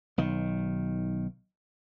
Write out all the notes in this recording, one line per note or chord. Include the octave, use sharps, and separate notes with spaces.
B1 D#3